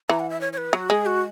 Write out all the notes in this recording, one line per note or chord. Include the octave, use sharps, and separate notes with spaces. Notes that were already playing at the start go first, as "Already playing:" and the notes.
E3 A#5
F#5
E5
C#5
C#5
B4
F#3 F#4
G#3 G#4
F#4